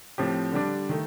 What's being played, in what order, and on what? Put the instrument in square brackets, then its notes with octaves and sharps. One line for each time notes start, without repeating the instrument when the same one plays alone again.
[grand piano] A2 F3 C4 G4
D3 G3 D4
D#3 A3